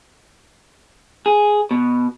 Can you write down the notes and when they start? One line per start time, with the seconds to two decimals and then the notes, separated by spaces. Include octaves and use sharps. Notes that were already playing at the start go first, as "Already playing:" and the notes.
1.26 G#4
1.71 B2